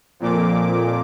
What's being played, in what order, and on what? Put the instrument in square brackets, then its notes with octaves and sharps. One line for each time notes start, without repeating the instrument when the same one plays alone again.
[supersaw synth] F2 A#2 D6